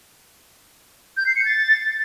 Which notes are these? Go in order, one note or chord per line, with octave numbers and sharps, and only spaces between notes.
G6
C7
C#7
A6